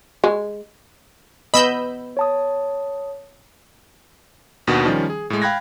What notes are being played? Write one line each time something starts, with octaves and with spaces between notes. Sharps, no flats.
G#3
B3 D#5 B5 E6 G6
C#5 A5 D#6
D#2 B2 D#3 D4 F#4
D#3 F3 G3 C#4
G#4
A2 G#3
F5 G5 B5 F#6 G#6 A#6